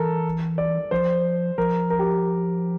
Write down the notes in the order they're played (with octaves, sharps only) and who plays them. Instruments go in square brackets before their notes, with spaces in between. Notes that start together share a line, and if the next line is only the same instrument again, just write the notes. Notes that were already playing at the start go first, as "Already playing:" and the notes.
Already playing: [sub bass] E3 [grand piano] A4 A#4
[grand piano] D5
[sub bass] F3 [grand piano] C5
[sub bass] F3 [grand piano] A#4
[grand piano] A#4
G4